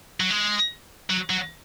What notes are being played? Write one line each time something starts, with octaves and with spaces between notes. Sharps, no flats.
F#3
G#3
F#3
F#3